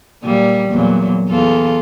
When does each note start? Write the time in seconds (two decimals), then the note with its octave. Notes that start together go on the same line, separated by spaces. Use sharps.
0.23 A#2 G3
0.69 E2 A#2 F#3
1.29 E2 F4 A4